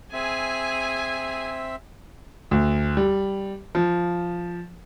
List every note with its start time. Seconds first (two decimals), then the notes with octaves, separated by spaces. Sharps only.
0.13 C4 G#4 E5 G#5
2.51 D2
2.97 G3
3.75 F3